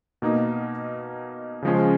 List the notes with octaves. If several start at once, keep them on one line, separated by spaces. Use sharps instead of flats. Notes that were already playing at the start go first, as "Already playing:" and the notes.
B2 A#3 D#4
C#3 F3 G#3 C#4